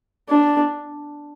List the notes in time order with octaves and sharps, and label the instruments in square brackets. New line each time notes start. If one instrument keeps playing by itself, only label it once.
[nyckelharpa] D4